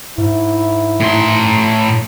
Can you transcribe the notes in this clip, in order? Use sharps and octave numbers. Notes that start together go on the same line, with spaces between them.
G#2 E4
A2 C6